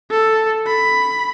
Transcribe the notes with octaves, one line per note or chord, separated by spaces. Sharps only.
A4
B5